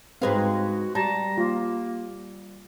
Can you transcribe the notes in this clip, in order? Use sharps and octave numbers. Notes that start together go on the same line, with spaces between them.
G#2 G#3 C4 F#4 B4 D#5 F5
G3 A5 A#5
A#3 F4